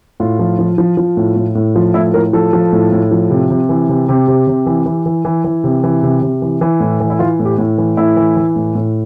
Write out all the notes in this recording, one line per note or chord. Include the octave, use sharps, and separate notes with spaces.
A2 F4
F3
F3
F3
F3
A2
A2
A2
F3 F4
A2 E4
A2 A#4
F3 A4
F3
A2
A2
F3
C3
C3
E3
C3
C3 G4
C3
C3
E3
E3
E3
E3
E3
C3
E3
C3
C3
E3
E3
A2
E3
E4
E3 F4
A2
G4
A2
E3
A2 E4
E3
E3
A2
A2